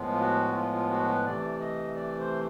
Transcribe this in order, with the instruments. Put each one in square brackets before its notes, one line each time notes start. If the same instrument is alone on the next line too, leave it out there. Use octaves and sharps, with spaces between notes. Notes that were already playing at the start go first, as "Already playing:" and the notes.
Already playing: [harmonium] A2 F3 G#3 B3
F4
F#4
F4
F4
F#4
B4
C3 E3 A3 D5
D#5
D5
C5